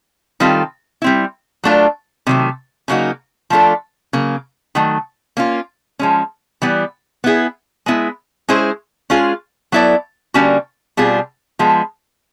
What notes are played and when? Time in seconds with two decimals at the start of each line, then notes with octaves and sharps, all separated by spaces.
0.40 D#3 G3 C4 F4 A4
1.02 G3 C4 E4
1.64 F#3 A3 D4 F4
2.27 C3 D#3 F#3 A3
2.88 C#3 F#3 A#3 D#4 F#4
3.50 F3 A3 D4 F4 A4
4.13 C#3 F#3 A#3
4.75 D#3 F#3 A3
5.37 A#3 C#4 F4
5.99 F3 G#3 C#4
6.62 E3 G3 B3
7.24 B3 E4 G#4
7.86 G#3 B3 E4
8.49 G#3 C#4 E4 G#4 C5
9.10 G#3 C#4 F4 G#4
9.72 F#3 B3 E4 A4 D5
10.34 D3 G3 A#3 C#4 F#4
10.97 B2 G3 C4 F4 G#4
11.59 F3 G#3 B3